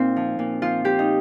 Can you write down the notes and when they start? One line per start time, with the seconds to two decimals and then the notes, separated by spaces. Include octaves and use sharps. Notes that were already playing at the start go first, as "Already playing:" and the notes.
Already playing: A#2 C4 D#4 F4
0.16 F3
0.39 A#2
0.62 F3 F4
0.84 F3 G4
0.99 D#4